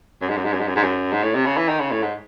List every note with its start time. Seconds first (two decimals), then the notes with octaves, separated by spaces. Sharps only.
0.21 F#2
0.29 G#2
0.37 F#2
0.45 G#2
0.53 F#2
0.60 G#2
0.68 F#2
0.76 G#2
0.83 F#2
1.12 G#2
1.23 A2
1.35 C3
1.46 C#3
1.57 E3
1.69 D#3
1.79 C#3
1.91 A2
2.02 G#2